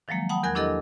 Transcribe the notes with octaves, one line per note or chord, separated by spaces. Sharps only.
D#3 F3 F#3 G#3 A#3
F#5 G5 A5 B5 D#6
E2 A#4 G#5 F#6 G#6
D4 E4 G4 A4 A#4 D#5